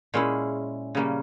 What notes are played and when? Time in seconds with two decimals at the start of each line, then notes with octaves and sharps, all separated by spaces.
0.14 A#2 G#3 C#4 E4
0.95 C#3 G3 A#3 C#4